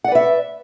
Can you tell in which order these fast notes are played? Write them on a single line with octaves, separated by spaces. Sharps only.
F#5 D5 B4 E5